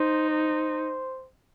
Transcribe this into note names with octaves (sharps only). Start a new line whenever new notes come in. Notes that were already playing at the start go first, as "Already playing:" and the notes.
Already playing: D#4 C5
C5